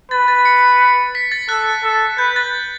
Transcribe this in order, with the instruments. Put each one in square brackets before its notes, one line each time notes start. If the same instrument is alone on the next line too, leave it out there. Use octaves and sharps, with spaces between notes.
[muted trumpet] B4 [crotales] A6
[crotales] A6
C#7
B6
A6
[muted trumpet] A4 [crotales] F#6
[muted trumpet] A4
[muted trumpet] B4 [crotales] G6
[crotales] A6